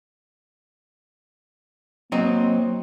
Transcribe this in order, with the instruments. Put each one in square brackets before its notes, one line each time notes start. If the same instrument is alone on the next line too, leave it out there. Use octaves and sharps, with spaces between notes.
[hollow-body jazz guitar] F#3 C4 D#4 [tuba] A#3